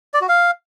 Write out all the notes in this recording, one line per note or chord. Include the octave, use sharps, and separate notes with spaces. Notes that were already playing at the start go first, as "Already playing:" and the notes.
D5
F#4
F5